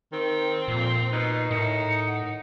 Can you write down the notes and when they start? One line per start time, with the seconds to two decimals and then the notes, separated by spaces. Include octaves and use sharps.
0.13 D#3 C4
0.68 F2 A#2 C7
1.12 B2 D#4
1.51 A2 D#3 D#4 C#7
2.08 F#5